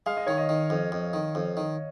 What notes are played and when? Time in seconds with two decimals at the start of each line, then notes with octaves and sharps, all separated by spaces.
0.06 G#3 F5
0.17 D#5
0.27 D#3 C#5
0.38 D#5
0.49 D#3
0.70 F2
0.92 F2
1.13 D#3
1.35 F2
1.57 D#3